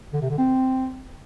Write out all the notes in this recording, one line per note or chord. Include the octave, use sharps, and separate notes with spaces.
D3
C3
D3
C4